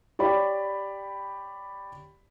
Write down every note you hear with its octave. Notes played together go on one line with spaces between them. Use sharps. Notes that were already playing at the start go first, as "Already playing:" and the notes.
G4 C#5 D5 B5